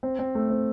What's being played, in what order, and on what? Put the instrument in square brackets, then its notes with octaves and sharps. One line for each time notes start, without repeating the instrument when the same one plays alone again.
[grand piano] C4
C4
A3
C4